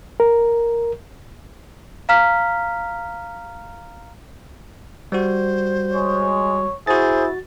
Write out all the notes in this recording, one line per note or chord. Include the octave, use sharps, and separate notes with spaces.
A#4
F5 A#5 F6 B6
G3 F#4 C5
G#3 C#5
E4 F#4 G#4 C5 A6